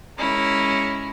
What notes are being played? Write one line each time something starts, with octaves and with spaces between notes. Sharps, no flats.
G#3 C#4 E4 A#4